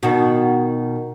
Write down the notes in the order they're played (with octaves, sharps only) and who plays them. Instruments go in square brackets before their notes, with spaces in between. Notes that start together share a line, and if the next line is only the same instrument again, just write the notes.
[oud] B2 D#3